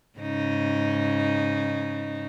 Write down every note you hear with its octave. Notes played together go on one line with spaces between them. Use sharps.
G#2 C#3 D#4